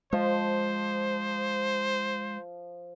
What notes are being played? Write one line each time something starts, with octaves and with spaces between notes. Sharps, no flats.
F3 G#3 C5